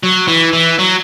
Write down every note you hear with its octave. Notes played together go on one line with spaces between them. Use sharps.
F#3
E3
E3
F#3